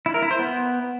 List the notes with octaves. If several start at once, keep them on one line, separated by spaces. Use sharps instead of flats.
E4
A#4
E4
C5
B3